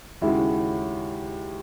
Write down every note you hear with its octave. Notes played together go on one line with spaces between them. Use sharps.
D#2 C#3 G#3 C#4 E4 F#4